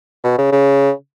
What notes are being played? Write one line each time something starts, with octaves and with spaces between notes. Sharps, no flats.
B2
C#3
C#3